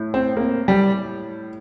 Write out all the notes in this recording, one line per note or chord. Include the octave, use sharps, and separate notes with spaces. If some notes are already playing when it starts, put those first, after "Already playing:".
Already playing: A2
C4
A#3
G3